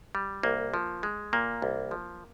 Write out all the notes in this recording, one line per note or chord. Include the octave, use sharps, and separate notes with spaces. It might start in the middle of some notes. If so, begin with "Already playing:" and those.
G3
C2 A#3
F3
G#3
A#2 A#3
C2
F3